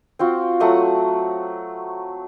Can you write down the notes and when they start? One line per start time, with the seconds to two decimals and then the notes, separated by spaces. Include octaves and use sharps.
0.19 C4 F4 F#4
0.60 F#3 A3 F#5 D#6